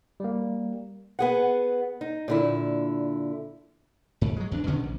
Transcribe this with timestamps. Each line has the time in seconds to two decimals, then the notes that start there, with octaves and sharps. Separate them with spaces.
0.20 G3 A#3
1.19 B3 G#4 F#5
2.01 D#4
2.28 A#2 D3 E4
4.21 G#2
4.36 F#3 G#3
4.52 E2 D4
4.67 B2 D3 D#3 C#4
4.83 A#1